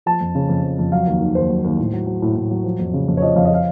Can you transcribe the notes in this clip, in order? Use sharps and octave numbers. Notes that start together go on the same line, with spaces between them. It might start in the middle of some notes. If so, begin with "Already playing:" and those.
F3 A5
F2
C#3
F2
F3
F2
F#3 F5
D#2
D#3
D#2 C5
F#3
D#2
A2
F#3
F#3
A2
A2
F#3
F3
F2
C#3
F2
C#5
F3 D#5
F2 F5
D#5
F3 F5